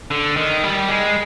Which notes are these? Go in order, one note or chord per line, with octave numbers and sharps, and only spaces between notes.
D3
D#3
G3
G#3